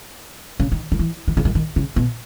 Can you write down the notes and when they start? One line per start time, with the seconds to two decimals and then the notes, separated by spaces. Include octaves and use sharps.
0.60 C#3
0.72 D#3
0.92 D#3
0.99 E3
1.28 D#3
1.37 C#3
1.45 D#3
1.55 D#3
1.76 C#3
1.96 B2